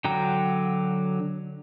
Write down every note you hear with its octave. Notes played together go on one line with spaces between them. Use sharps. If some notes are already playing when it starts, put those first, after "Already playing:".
D3 F#3 G5 A#5